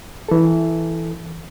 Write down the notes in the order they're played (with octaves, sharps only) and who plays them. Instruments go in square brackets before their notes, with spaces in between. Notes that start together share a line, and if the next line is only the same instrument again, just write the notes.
[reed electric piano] E3 A4